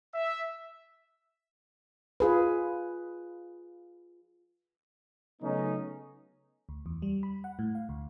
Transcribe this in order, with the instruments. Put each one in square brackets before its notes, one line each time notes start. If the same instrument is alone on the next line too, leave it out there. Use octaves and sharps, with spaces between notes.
[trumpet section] E5
[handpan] F4 G#4 B4
[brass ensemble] C#3 F#3 A3 B3 C#4 D#4
[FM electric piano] D2
E2
G3
B5
F#5
A2
F5
D2